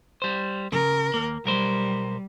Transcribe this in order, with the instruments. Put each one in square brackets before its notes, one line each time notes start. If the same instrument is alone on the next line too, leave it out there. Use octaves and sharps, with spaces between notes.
[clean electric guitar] G3 C5
[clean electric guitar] C#3 [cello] A#4
[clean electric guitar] D#2 A#3
[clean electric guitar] B1 A#4 C5 [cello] G3